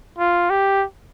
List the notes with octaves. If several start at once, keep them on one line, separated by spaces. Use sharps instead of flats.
F4
G4